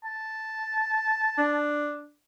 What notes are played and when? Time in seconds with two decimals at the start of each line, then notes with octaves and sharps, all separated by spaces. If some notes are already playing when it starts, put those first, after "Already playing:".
0.05 A5
1.38 D4